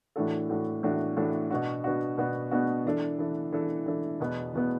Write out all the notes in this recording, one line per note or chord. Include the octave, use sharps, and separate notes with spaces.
A2 E3 D4 F#4 A4
A2 E3 D4 F#4 A4
A2 E3 D4 F#4 A4
A2 E3 D4 F#4 A4
B2 B3 D4 F#4
B2 B3 D4 F#4
B2 B3 D4 F#4
B2 B3 D4 F#4
E3 D4 A4
E3 D4 A4
E3 D4 A4
E3 D4 A4
E2 B2 B3
E2 B2 B3